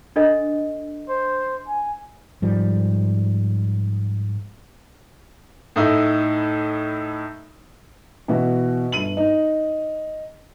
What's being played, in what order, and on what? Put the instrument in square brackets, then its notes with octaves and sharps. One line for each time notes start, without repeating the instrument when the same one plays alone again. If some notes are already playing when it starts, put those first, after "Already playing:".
[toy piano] D4 A4 D#5
[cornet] C5
G#5
[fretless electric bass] G#2 F3 G3
[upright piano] A2 D#4 E4
B2 E3 E4 F#4
G1 D#7 F#7
D#4